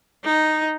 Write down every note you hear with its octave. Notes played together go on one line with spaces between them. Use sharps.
D#4